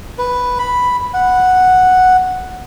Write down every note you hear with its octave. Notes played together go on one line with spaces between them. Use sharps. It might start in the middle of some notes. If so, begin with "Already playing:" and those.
B4
B5
F#5